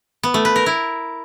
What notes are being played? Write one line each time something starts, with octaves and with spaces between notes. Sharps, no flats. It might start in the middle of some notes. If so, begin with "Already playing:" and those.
B3
A3
B4
A#4
E4